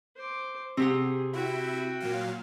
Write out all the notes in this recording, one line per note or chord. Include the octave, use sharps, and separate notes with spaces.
C5 D6
C3 C4 G4 G#4 F#5
E4 F#4 E5 G5
A#2 F#3 F5